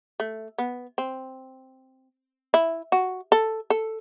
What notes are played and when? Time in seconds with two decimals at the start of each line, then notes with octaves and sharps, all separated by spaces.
0.20 A3
0.58 B3
0.98 C4
2.54 E4
2.92 F#4
3.32 A4
3.70 A4